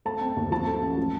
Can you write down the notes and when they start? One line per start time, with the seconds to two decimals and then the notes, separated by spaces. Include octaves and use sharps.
0.05 A3 A5
0.21 C4
0.37 D#2
0.51 F3 A5
0.67 A3
0.82 A1
0.97 F3